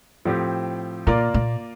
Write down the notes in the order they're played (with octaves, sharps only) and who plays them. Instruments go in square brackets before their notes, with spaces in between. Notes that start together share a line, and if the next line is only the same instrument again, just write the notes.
[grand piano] A2 F3 C4 G4
[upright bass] A#2 [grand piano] A#3 F4 A#4 D5
[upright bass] A#2